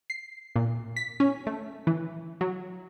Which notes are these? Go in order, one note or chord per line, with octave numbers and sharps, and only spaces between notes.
C7
A#2
B6
C#4
A3
E3
F#3